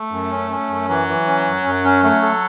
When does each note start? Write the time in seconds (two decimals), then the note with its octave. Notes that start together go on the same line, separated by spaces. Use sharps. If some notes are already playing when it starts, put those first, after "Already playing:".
Already playing: A3
0.11 F#2
0.31 C#4
0.51 C#4
0.69 F#2
0.88 E3 F#3
1.08 E3
1.27 C#4
1.46 F#2
1.65 F#2
1.84 C#4
2.03 F#3 A3
2.22 A4